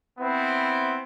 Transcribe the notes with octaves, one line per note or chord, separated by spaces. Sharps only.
B3 C4 E4